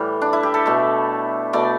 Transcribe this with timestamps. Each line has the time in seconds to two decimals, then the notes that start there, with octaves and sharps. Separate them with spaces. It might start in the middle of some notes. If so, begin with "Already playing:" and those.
Already playing: A2 E3 G3 D5
0.22 D4
0.33 E4
0.43 G4
0.54 A4
0.66 B2 A3
1.53 B2 A3 D5